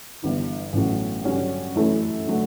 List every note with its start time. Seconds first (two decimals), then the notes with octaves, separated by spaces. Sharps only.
0.22 G1 G2 E3
0.73 A1 A2 F#3
1.24 G2 D3 F#3 C#4 G4
1.75 F#2 E3 A3 E4
2.27 D3 F#3 A3